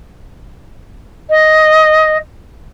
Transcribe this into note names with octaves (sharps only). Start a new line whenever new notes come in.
D#5